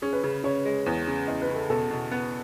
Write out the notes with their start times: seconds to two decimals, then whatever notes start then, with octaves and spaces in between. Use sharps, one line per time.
0.02 C#4 G#4
0.13 B4
0.24 C#3
0.44 C#3 C#5
0.65 G#3
0.86 E2
1.07 C#3
1.28 E2 D#5
1.42 B4
1.49 C#3
1.56 A4
1.70 B2 A4
1.91 B2
2.12 B3